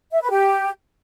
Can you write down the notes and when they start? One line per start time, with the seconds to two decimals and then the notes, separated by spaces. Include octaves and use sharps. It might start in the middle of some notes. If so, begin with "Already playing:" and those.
0.11 E5
0.21 B4
0.30 G4